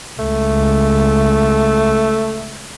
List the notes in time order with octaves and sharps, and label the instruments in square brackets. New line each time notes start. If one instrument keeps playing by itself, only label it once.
[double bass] C#2 [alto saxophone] A3